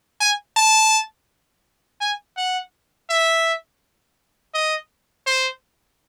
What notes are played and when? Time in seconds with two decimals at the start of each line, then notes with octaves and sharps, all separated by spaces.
0.21 G#5
0.57 A5
2.01 G#5
2.37 F#5
3.10 E5
4.54 D#5
5.26 C5